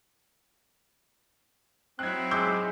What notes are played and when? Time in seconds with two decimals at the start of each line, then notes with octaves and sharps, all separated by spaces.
1.99 F#3 C4 D#4 E4 F#6 G#6
2.31 G#3 D6 E6 G6